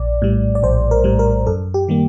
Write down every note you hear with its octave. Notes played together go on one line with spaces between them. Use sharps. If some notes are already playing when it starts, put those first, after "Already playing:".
Already playing: A#1 D5
A2 G3
D5
A#1 C5
A#4
A2 G3
A#4
F#2 A4
G4
D#3 G3 A#3